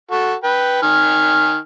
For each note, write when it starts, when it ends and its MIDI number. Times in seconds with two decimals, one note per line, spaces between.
0.11 0.34 66
0.11 0.34 69
0.11 0.34 85
0.44 0.79 71
0.44 0.79 79
0.44 0.79 83
0.82 1.57 51
0.82 1.57 80
0.82 1.57 89